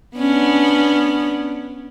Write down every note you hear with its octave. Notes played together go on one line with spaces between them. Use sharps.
B3 C#4 D4